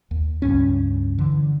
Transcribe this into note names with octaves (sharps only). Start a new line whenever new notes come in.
D#2
C#2 G2 C#4
D3 E3